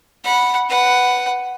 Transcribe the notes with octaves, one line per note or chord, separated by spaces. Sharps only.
F#5 B5
B4 F#5